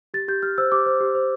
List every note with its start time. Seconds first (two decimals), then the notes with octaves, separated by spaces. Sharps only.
0.14 G4 A6
0.28 G4 G6
0.43 G4 F6
0.58 C5 E6
0.72 G4 D6
0.86 C5
1.01 G4
1.15 C5